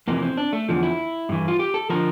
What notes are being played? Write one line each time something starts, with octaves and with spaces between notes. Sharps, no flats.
F2 C3 E3 A#3
C4
D4
A3
E2 D3 F3
E4
G2 E3
F4
G4
A4
D3 F3 A#4